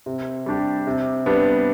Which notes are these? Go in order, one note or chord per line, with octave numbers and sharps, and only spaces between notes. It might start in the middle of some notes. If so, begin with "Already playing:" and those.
C3
G3 D4 G4
C3
G3 B3 D4